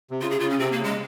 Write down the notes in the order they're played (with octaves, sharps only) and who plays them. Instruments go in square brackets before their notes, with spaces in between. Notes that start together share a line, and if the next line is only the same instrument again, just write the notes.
[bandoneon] C3
[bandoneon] C#3 [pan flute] F4
[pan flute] G#4
[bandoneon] C#3 [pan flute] F4
[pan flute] C#4
[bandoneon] C3 [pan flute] C4
[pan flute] A#3
[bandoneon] C#3
[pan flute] G#3